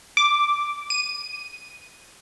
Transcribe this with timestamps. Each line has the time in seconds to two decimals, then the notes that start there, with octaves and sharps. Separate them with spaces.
0.17 D6
0.90 D#7